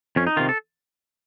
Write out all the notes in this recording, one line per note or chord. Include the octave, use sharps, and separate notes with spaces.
F2 C#4
D#4
C3 D#3 F4
A4